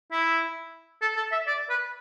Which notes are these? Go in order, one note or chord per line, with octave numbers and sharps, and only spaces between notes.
E4
A4
A4
E5
D5
B4